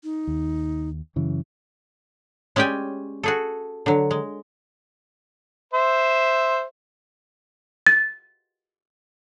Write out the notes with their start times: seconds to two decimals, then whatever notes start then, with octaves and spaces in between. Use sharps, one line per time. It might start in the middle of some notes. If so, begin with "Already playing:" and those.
0.04 D#4
0.27 D#2
1.16 F#2 C#3 E3
2.56 G#3 C#4 G4 D5 G5 G#5
3.23 F#4 G#4 A4
3.86 D3 F#3
4.11 G#3
5.74 C5 E5
7.87 A6